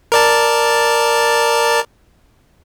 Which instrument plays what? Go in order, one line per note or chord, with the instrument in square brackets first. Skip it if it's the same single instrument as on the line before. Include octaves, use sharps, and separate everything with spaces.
[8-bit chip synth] A#4 D5 A5